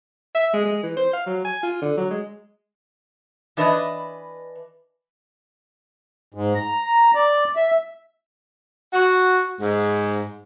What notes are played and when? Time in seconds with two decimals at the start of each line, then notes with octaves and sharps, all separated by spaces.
0.35 E5
0.53 G#3
0.65 G#3
0.83 E3
0.97 C5
1.13 F5
1.26 F#3
1.45 G#5
1.63 F4
1.82 D3
1.97 F#3
2.11 G#3
3.57 E3 D4 B4 D#5
6.34 G#2
6.55 A#5
7.15 D5
7.56 E5
8.93 F#4
9.60 G#2